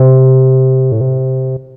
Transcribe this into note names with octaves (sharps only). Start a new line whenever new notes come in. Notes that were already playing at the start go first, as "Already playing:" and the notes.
Already playing: C3
A2
C3